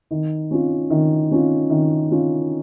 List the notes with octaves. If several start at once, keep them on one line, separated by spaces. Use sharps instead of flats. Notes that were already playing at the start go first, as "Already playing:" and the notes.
D#3
C#4 F4
D#3
C#4 F4
D#3
C#4 F4